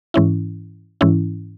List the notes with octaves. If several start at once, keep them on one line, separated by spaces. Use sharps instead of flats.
G#2 E3 C#4 E4
G#2 E3 C#4 E4